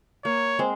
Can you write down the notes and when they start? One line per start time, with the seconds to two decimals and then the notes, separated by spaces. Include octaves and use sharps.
0.25 A#3 C#5
0.59 G#3 C4